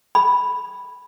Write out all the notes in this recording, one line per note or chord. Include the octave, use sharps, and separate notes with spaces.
B5